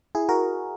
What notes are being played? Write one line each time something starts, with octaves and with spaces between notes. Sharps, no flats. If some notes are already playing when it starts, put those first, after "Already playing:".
E4 G#4
F#4 A#4